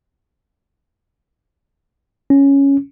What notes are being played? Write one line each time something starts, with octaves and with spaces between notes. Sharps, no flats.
C#4